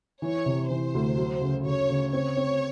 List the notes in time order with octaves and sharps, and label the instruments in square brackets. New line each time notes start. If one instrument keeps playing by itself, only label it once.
[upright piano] E3 [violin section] C#5
[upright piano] C3
[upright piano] E3 [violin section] C5
[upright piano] D2
F#3
C#3
[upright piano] C#3 [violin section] C#5
[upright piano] C#3
[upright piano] C4 [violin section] C#5
[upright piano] C4